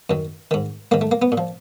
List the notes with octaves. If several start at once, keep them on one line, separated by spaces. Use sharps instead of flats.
F#2 D#3
G#2 D#3
G#2 D#3 A#3
A3
A#3
B3
A#2
F3